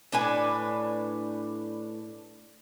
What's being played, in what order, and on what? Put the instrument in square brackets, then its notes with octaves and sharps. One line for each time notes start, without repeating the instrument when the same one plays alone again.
[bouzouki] A2 D4 B4 G#5